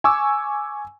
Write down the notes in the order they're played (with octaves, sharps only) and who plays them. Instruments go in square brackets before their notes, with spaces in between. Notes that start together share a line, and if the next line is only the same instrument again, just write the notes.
[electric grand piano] G#5 C#6 D6 E6